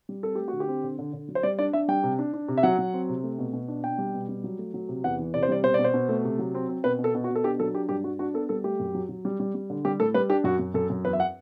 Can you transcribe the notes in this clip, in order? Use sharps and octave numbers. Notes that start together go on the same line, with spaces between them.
G3
C4 A4
A3 G4
F#4
D3
G4
C4
D3
D3
D3
F#3
C5
G3 D5
D4 D5
D4 E5
G3 G5
C3
D4
D4
C3
E5
F#3 F#5
F#3
C4
C3
A3
B2
B2
D4
B2 G5
G3
B2
G3
F#3
A3
F#3
C3
E2 F#5
E3
C3 D5
C5
G3 D5
B2 C5
B2 D5
C5
B2
A3
C3
F#3
C4
C4
B2 B4
B2
A4
B2
F#4
B2
A4
D4 G4
F#3 A4
D4 G4
G2 G4
G3 F#4
D4 F#4
B3 A4
G3 A4
A3 G4
F#2
F#3
F#3
G3
G3
G3
D3
G3 G4
A2 A4
G3 B4
D4 G4
F#2 F#4
F#2
F#2 A4
F#2
E2 B4
E5
F#5